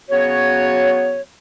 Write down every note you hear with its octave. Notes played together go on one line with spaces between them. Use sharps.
C#3 F#3 B3 F#4 C#5